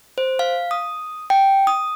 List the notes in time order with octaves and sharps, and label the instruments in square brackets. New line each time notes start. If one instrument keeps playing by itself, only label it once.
[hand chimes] C5
F5
D#6
G5
D#6